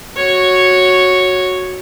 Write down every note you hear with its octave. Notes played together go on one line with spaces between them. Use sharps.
F#4 C#5